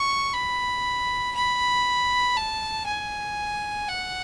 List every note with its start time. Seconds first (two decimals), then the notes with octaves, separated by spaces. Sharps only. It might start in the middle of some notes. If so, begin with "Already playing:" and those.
Already playing: C#6
0.33 B5
1.35 B5
2.37 A5
2.86 G#5
3.88 F#5